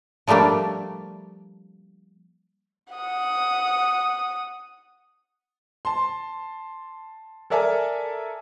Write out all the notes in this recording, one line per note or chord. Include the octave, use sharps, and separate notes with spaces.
F3 G3 A3 A#3 D4
F#5 D#6
A5 C6
A4 A#4 D5 E5 G#5 A5